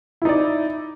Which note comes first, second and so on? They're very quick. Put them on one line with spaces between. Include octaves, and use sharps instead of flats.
E4 D#4 D5